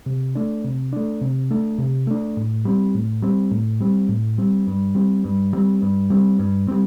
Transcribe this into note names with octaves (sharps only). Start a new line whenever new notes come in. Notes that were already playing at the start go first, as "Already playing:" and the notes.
C3
A3 D4
C3
A3 D4
C3
A3 D4
C3
A3 D4
A2
G3 C4
A2
G3 C4
A2
G3 C4
A2
G3 C4
G2
G3 C4
G2
G3 C4
G2
G3 C4
G2
G3 C4